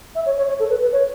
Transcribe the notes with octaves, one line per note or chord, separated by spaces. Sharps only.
E5
C#5
C#5
C#5
A4
B4
B4
C#5